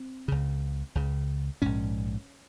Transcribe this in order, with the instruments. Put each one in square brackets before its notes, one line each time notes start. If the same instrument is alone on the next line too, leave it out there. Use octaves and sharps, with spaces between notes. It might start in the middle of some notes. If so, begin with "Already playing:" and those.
Already playing: [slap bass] C4
C#2 C#3
C#2 C#3
A#1 G#2 C#4